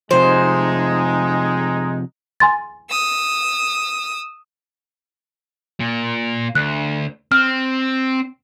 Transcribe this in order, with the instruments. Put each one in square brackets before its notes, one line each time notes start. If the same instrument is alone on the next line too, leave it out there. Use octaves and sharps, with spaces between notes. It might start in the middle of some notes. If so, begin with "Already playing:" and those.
[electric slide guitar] C3 F3 [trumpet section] G#3 D#4 [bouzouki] C5
[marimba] G#5 C6 A6
[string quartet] D#6 E6
[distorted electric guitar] A#2
[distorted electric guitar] D2 [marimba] F#6
[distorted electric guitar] C4 [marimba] F6